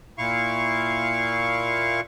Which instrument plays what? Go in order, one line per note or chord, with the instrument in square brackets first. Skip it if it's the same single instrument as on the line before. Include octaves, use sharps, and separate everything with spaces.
[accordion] A#2 E4 F5 C#6